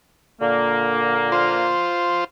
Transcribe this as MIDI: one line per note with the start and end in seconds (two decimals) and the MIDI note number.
0.41 1.72 46
0.41 1.72 50
0.41 1.72 58
1.32 2.24 65
1.32 2.24 72